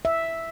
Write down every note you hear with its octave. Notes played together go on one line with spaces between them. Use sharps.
E5